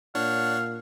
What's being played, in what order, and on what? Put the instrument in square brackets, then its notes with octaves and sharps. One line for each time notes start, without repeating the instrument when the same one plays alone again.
[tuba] A#2 [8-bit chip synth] D4 C#5 F#5 [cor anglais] F5